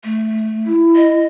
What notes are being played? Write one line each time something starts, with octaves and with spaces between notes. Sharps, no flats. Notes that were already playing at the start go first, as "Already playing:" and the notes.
A3
E4
D#5